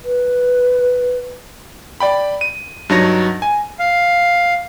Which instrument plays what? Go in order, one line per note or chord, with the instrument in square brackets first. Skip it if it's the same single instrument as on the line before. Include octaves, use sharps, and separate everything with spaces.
[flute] B4
[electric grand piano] D5 G5 B5
D#7
G2 F#3 D#4 C#5 A#6
G#5
[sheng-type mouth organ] F5